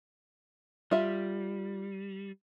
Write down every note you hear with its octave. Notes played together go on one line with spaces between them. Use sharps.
G3 F4 E5